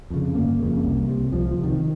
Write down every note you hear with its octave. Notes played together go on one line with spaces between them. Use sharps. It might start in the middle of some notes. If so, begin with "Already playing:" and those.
F2 C#3
G1 A#3
F2 C#3
C2
C3
C2 F3
F3
C3
D#3